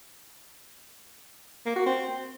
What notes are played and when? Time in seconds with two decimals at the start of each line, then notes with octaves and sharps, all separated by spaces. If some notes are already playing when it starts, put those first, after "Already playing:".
1.66 A#3
1.76 F#4
1.86 C4